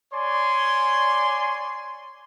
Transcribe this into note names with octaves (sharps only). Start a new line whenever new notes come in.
C#5 D5 G#5 C6